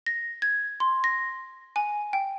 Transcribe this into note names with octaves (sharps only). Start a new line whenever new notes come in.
A#6
G#6
C6
A#6
G#5
G5